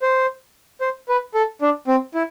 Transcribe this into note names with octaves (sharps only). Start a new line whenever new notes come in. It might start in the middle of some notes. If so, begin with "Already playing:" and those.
C5
C5
B4
A4
D4
C4
E4